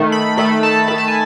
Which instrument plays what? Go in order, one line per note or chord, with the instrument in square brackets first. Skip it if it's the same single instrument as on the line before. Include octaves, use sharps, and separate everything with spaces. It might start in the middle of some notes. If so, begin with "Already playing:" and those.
Already playing: [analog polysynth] D#3 A3
B5
D#3 A3 B5
A5
D#3 A3 B5
A5
G#5